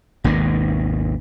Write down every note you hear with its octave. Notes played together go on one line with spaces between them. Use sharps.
G#1 D#2 B2 D#3